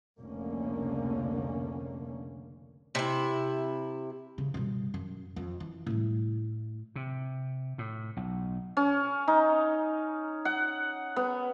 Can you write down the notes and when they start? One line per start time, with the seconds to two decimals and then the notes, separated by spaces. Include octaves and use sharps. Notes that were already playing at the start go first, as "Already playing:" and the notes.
0.18 F1 C#2 D3 A#3 C#4
2.95 C3 E4
4.38 C#3
4.54 G2 B2
4.94 F#2
5.36 F2
5.60 E3
5.86 A2 G3
6.96 C3
7.78 A2
8.17 B1
8.77 C#4
9.28 D#4
10.45 F#5
11.16 B3